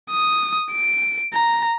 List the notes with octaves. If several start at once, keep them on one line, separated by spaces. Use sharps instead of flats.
D#6
D7
A#5